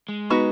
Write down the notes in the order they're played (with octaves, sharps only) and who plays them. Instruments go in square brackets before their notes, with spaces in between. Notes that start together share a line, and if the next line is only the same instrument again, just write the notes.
[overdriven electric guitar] G#3
[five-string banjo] B3 D#4 F#4 B4